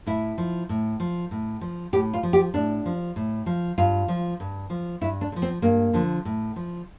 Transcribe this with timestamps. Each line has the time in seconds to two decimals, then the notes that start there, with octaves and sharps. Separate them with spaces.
0.06 A2 E4
0.38 F3
0.69 A2
1.00 F3
1.31 A2
1.61 F3
1.93 A2 G4
2.14 F4
2.23 F3
2.33 G4
2.54 A2 D4
2.86 F3
3.16 A2
3.46 F3
3.78 G2 F4
4.08 F3
4.40 G2
4.70 F3
5.01 G2 E4
5.21 D4
5.32 D3
5.36 F3
5.42 C4
5.62 G2 A#3
5.93 D3 F3
6.25 A2
6.56 F3